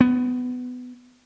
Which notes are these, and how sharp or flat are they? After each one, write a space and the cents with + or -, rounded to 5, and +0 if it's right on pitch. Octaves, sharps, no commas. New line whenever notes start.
B3 +15